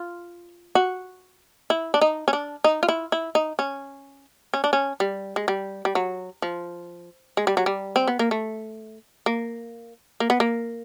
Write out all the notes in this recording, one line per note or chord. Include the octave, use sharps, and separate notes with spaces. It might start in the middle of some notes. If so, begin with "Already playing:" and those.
Already playing: F4
F#4
E4
D4
D#4
C#4
D4
D#4
F4
E4
E4
D#4
C#4
C#4
D4
C#4
G3
G#3
G3
G3
F#3
F3
G#3
G3
F#3
G3
C4
B3
A#3
A3
A#3
A#3
B3
A#3